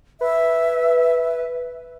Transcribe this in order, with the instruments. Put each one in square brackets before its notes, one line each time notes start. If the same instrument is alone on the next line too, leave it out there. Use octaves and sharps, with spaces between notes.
[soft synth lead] B4 [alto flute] E5